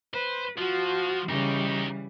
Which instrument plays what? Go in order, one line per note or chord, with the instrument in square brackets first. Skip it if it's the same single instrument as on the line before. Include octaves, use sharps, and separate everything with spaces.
[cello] B4 [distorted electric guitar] C5
[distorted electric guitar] F3 [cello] F4 F#4
[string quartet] C#3 [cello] E3 G3 [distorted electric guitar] D#4 G4